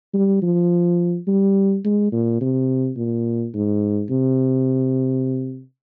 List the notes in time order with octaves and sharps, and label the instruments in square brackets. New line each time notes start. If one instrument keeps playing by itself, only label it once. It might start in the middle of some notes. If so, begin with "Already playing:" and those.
[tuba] G3
F3
G3
G#3
A#2
C3
A#2
G#2
C3